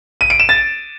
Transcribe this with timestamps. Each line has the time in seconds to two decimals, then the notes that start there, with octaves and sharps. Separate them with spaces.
0.21 D#7
0.30 D7
0.40 E7
0.49 A6